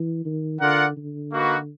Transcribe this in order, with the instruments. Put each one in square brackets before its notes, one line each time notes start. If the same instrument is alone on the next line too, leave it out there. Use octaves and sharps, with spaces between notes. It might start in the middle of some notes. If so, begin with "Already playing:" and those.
Already playing: [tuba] E3
D#3
[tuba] D3 [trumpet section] F4 A#4 D5 F#5
[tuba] D3
[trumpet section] A#3 D#4 F#4 B4